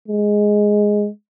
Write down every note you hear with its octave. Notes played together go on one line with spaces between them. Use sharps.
G#3